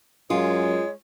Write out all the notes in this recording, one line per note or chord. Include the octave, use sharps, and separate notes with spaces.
F#2 G#3 F4 C#5